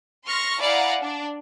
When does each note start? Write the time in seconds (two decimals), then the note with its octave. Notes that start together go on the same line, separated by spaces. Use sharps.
0.24 C6 C#6 F6 A#6
0.59 E4 D5 F5 F#5 G#5 A#5
1.01 D4